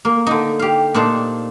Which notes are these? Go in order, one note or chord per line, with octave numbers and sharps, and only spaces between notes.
A#3
D3 D#4
G4 F5
A#2 D4 D#4 C5 A5